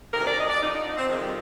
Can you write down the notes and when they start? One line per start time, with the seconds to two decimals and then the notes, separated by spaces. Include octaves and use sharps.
0.12 D2 C3 D#3 A#4
0.25 D5
0.36 D#5
0.48 D5
0.60 F2 D3 D#4
0.73 D#4
0.85 D#4
0.97 C4
1.08 F2 C3 D#3 G#3
1.20 G3